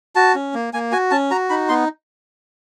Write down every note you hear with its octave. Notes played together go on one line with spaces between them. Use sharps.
F#4 A5
C#4
A#3
A#3 G#5
F#4 G#5
C#4 A5
F#4 A#5
D#4 B5
B3 C6